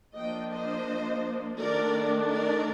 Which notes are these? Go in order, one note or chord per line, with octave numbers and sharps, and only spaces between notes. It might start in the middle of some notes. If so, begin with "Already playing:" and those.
F3 A#3 D4 D#5 G5
C5 D#5
D#3 A3 D4 A#4 D5
A#4 D5